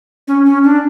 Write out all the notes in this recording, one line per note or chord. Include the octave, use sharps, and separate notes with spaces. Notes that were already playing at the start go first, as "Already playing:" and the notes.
C#4
C#4
D4